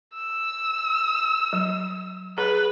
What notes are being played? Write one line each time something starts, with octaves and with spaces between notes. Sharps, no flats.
E6
F#3
G#4 B4